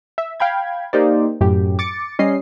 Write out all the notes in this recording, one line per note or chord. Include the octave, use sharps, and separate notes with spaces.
E5
F5 G5 B5 G#6
A#3 D#4 G4 C5 D5
F#2 A2 G4
D6 A6 C#7
G3 C#4 D#5 C7